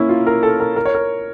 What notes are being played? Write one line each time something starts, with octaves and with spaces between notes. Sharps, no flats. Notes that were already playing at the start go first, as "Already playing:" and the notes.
Already playing: A#3 C#4 E4
F4
A#4
A4
A#4
A#4
C#5
A#4